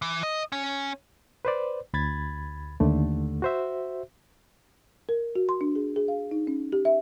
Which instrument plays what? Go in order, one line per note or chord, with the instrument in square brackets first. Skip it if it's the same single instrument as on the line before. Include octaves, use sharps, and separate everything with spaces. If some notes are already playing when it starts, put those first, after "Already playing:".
[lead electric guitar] E3
D#5
C#4
[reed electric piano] B4 C5 D5
D2 B5 G#6 A6
D#2 D3 A3
F#4 C5 E5
[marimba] A#4
F#4
C6
D4
G#4
G#4
F5
D#4
C#4
G4
E5